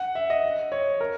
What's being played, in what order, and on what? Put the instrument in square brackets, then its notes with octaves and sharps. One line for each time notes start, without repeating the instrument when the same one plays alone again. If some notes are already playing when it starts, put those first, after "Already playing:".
Already playing: [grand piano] F#5
E5
D#5
C#5
A#4